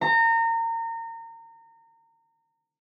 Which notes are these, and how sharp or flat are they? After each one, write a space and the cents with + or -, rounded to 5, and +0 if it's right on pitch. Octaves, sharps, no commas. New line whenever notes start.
A#5 -30